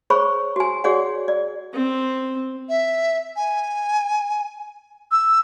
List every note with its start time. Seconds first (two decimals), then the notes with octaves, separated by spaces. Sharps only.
0.10 G#4 C5 C#5 B5 C#6
0.56 F#4 G#5
0.84 F#4 G#4 C#5 D5 F#5
1.28 D5
1.74 C4
2.69 E5
3.36 G#5
5.12 E6